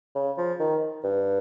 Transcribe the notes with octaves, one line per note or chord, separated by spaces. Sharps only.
C#3
F3
D#3
G2